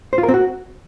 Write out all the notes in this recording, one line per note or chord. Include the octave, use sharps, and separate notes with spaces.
C5
F4
A#4
C4
F#4